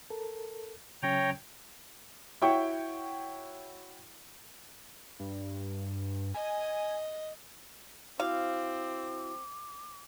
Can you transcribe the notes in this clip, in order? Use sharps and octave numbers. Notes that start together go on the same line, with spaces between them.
A4 A#4
C#3 F#3 C#4 C#5 G5 A#5
E4 F#4 C#5 G5 C#6
G2
D#5 G#5
C4 E4 F#4 C5 F5 D6